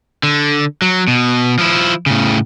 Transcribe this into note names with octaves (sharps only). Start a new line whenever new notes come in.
D3
F#3
B2
F3 E4
A2 C#3